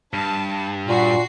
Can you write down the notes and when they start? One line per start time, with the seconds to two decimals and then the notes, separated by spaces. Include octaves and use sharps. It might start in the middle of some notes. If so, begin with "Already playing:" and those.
0.14 G2 A5
0.88 A#2 F#4 C7